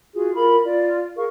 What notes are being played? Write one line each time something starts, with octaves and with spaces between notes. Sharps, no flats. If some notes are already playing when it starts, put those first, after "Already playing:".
F4 F#4 G#4
F4 A#4 B5
F4 D5
G#4 A#4 F5 C#6